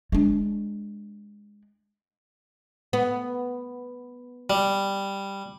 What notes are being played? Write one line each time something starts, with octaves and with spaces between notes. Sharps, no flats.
G#3 D4
B3
G3